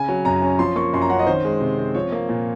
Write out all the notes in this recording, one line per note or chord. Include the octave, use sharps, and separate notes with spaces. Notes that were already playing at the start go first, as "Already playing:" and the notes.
Already playing: C#3 G#5
F#3
F#2 A#5
C#4
F3 C6
A#3 C#6
F#2 C6
A#5
C#4 F#5
D#5
D#3 C5
G#3
C3
C4
F3 C#5
A#3
A#2